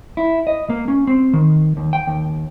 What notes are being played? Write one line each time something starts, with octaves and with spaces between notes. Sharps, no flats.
E4
D#5
A#3
C#4
C4
D#3
D#2
G5
D#2